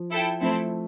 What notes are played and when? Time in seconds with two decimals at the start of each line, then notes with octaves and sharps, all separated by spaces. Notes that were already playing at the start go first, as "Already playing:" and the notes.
Already playing: F3
0.11 E4 A4 E5 G5
0.41 F3 A3 C4 E4 A4